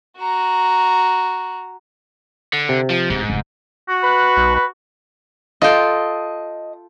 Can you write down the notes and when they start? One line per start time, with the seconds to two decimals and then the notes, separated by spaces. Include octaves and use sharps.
0.18 F#4 A#5
2.53 D3
2.69 C3
2.90 F3
3.10 D1 G#2
3.29 F1 F2
3.89 F#4
4.03 B4
4.37 B1
4.55 B4
5.62 F4 A4 D#5 G5